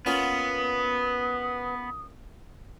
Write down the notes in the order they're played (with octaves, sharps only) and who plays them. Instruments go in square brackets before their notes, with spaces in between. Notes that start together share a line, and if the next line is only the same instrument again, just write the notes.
[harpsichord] A#3 C#4 F4 [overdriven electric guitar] B3 [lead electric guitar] B4 F#5 [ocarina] D#6